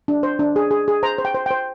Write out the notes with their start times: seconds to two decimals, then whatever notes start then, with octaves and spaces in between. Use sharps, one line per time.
0.08 D4
0.23 C5
0.39 D4
0.56 G#4
0.71 G#4
0.88 G#4
1.03 C5 A#5
1.18 C5
1.25 G5
1.35 C5
1.46 C5 G5